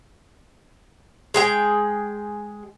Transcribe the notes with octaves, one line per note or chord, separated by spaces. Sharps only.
G#3 G#4 G5